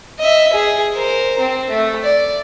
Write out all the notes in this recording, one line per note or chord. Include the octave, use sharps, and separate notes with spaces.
D#5 E5
G#4
A#4 C5
C4
A3
D5